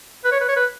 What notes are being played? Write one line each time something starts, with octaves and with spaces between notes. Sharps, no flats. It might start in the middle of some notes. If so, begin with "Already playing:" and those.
B4
C#5
B4
C#5
B4